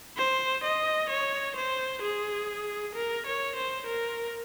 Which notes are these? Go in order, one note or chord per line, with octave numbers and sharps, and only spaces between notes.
C5
D#5
C#5
C5
G#4
A#4
C#5
C5
A#4